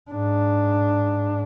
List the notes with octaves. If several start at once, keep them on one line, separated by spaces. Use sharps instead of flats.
G#2 D4